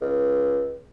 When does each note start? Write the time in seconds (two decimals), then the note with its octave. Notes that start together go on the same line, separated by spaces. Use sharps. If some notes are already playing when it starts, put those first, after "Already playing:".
0.01 C#2